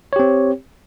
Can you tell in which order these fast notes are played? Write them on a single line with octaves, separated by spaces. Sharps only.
C#5 G4 C4